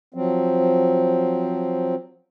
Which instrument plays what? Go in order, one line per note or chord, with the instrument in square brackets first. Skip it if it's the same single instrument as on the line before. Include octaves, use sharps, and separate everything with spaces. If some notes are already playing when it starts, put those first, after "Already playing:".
[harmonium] F3 F#3 C4